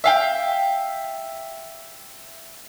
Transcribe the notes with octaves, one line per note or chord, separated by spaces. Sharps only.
E5 F5 G5